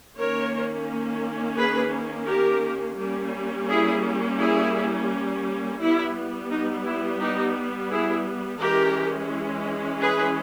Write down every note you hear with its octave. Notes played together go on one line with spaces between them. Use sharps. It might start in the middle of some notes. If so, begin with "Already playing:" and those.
D#3 A#3 C#4 A#4 C#5
G#4 B4
G4 A#4
G3 A#3 C#4
E4 G#4
E4 G#4
G3 B3 E4
D#4
E4
D#4 G4
E4 G#4
E3 G#3 C#4 G4 A#4
G#4 B4